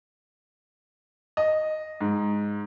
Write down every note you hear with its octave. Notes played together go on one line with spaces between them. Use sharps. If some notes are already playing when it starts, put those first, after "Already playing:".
D#5
G#2